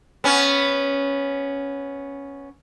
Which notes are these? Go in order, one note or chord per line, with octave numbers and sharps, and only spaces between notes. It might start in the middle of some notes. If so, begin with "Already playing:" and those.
B3 C#4